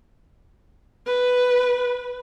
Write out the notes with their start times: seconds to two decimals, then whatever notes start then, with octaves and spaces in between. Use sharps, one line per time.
1.06 B4